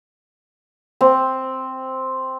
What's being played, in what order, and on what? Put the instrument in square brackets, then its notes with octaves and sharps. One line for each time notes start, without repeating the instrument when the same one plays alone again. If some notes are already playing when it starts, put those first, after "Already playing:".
[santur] C4